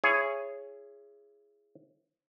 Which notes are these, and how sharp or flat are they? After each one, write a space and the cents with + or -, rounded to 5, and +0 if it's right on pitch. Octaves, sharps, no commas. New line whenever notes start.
E4 +30 G#4 +0 C#5 +0